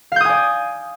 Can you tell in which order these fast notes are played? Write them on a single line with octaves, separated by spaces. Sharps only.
F5 G6 D#6 G#5 D5